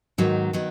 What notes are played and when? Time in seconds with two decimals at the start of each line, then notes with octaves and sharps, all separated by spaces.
0.18 G#2 D#3 F#3 B3
0.53 D#3 F#3 B3